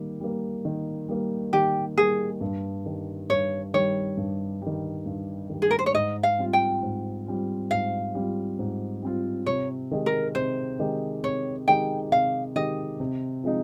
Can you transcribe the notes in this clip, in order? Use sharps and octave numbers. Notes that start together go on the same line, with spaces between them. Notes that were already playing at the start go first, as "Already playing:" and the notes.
Already playing: D#3 G3 A#3
G3 A#3
D#3
G3 A#3
D#3 G4
G3 A#3 G#4
G2
D#3 G3
G2 C#5
D#3 G3 C#5
G2
D#3 G3
G2
D#3 G3
G#4
A#4
C5
C#5
G#2 D#5
F5
G3 C4 F4
G5
G#2
G3 C4 F4
G#2 F5
G3 C4 F4
G#2
G3 C4 F4
C3 C#5
D#3 G#3 D#4 G4
A#4
C3 C5
D#3 G#3 D#4 G4
C3 C#5
D#3 G#3 D#4 G4 G5
C3 F5
D#3 G#3 D#4 G4 D#5
C3
F3 G#3 C4 D#4